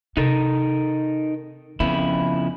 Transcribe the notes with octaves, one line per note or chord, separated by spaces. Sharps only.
C3 D#4 A4 A#4
F2 C#3 B3 E4